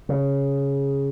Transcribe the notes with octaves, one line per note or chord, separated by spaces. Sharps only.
C#3